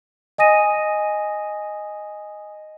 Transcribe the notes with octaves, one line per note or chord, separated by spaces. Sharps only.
D#5 G#5 D#6 A#6 D#7